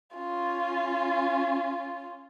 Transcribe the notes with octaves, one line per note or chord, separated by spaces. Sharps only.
C#4 F4